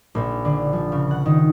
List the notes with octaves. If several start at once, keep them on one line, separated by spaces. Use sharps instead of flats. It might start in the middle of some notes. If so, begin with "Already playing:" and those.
A#1
D3
F3
C#3
F#5
D#3